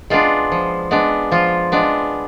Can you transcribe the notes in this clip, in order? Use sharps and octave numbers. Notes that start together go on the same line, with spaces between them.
G#3 B3 D4 F4
F3
G#3 B3 D4
F3 F4
G#3 B3 D4